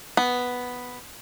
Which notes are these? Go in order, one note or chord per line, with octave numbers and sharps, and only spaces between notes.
B3